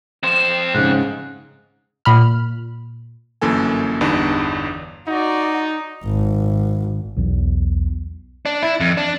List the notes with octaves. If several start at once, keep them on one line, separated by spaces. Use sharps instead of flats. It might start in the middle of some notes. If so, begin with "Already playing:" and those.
F2 C5 E7
G#2 C#3 F#6
A#2 B5 F6
G1 F#2 E3 A#3 A4 G#5
G1 E2 G2 D4 D#4
D#4 F#4 D5
G#1
B1 E2
D4
E4
F2
D4